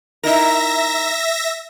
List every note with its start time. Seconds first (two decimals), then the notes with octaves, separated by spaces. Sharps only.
0.23 D#4 E4 A#4 E5 A#6